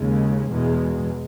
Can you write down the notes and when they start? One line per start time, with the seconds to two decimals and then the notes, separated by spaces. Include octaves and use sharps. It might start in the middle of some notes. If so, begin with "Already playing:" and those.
Already playing: D#2 C#3 G#3
0.49 E2 B2 G#3